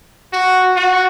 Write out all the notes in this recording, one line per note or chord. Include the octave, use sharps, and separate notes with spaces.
F#4
F#4